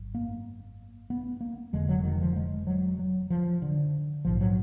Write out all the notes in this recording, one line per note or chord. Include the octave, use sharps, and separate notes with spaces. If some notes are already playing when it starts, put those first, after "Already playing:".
Already playing: G#1 F#2
A#3
B3
A#3
F1 F2 D3 G#3
F#3
D#3
F3
G#3
F#3
F#3
F3
D3
A#1 G#2 F3
F#3